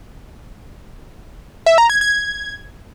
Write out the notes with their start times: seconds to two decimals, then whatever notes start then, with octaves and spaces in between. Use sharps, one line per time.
1.66 E5
1.78 A#5
1.90 G#6
2.01 G#6